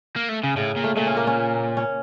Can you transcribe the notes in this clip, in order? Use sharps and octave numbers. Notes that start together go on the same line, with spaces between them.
A#3
A3
C#3
A2 C#3
A#2
A3
A#2 A3
C#4
A#3
C#4
C#4